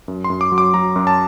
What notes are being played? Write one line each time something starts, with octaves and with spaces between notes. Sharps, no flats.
F#2
C6
F#2
D6
F#3
D6
F#3 A#5
F#2
A5